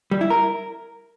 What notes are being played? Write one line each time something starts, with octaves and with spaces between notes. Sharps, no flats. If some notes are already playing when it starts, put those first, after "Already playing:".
G3
E4
A#4